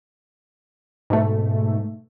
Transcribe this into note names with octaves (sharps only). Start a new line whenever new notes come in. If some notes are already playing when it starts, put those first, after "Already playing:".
G#2 B2 A3